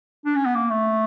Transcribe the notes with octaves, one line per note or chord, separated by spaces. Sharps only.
D4
C#4
B3
A#3
A3